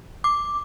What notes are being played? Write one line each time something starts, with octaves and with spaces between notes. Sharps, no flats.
D6